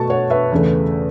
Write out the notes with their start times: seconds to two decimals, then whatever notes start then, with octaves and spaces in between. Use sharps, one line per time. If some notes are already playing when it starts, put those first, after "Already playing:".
Already playing: B2 A3 A5 C#6
0.10 C#5 F#5
0.30 B4 E5
0.52 E2 C#3 A3